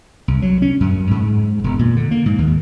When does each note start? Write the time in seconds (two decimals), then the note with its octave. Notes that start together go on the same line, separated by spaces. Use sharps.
0.28 C2
0.42 F#3
0.62 C#4
0.80 F#2
1.11 G#2
1.64 E1
1.79 A#2
1.96 D3
2.11 A#3
2.26 G#2
2.38 D#2